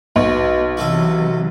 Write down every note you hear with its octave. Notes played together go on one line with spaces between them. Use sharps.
B1 B2
C3 E3 F#3 F#4 A4 E5